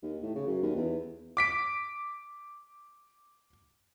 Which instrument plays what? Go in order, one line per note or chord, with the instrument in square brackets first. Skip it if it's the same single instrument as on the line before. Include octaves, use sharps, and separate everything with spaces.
[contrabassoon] D#2
A2
C#3
F#2
D#2
E2
[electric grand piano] D6 B6 D7